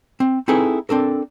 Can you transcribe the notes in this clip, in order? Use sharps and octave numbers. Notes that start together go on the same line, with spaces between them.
C4
C4 D#4 E4 G#4 A4 B4
C4 D4 A4 A#4